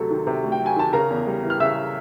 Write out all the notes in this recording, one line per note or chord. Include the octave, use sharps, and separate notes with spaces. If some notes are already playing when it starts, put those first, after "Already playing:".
Already playing: D2 C3 F#3 A4
D#3
C3
D2
G5
F#3
G#5
D#3 A5
C#3 A#4 A#5
E2
G3
E3
F6
C#3 E5 E6